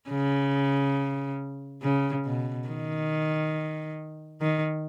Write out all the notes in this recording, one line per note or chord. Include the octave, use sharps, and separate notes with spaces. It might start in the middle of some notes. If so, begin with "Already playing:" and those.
C#3
C#3
B2
D#3
D#3